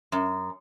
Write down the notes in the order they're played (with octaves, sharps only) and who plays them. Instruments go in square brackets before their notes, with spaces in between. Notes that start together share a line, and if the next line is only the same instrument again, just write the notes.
[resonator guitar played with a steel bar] F#2